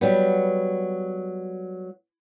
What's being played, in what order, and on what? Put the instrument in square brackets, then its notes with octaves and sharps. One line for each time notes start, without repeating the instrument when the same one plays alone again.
[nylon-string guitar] F#3 G3 B3